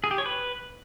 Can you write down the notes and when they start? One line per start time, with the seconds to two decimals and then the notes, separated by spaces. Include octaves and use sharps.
0.04 G#4
0.11 G4
0.18 C#5
0.26 B4